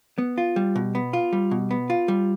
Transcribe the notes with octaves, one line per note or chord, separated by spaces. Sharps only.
B3
F4
G3
B2
B3
F4
G3
B2
B3
F4
G3